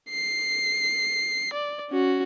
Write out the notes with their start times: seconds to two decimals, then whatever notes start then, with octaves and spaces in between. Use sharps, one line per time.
0.10 C7
1.53 D5
1.90 C#4 F#4